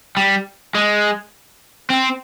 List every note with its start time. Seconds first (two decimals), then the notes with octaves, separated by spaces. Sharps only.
0.17 G3
0.75 G#3
1.90 C4